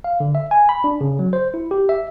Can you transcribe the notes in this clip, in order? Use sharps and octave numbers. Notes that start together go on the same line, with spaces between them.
F5
D3
E5
G#5
B5
D4
C#3
F#3
C5
E4
G4
E5